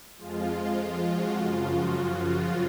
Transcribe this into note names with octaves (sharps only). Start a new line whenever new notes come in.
F2 F3 G#3 F4
F#4
F#2 C#3 F3 F4
F#4
F4